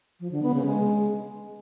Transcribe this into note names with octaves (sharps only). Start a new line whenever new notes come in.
F3
D3
B3
C#3
G#3